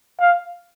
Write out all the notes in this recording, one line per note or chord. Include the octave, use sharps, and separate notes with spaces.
F5